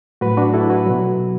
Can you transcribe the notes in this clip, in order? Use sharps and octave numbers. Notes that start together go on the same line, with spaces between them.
A2 F#3 F#4 B4
D4 F#4
E4 A4
F#4 B4
B2 F#3